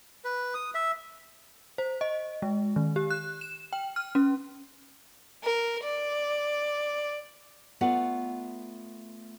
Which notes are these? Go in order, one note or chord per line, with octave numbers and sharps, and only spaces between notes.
B4
D#6
E5
C5
D#5
G#3
D#3
G4
F#6
E7
G5
F6
C#4
A#4
D5
A3 B3 F4 D5 F#5